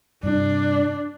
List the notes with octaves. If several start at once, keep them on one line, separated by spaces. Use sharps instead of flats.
G2 C3 D4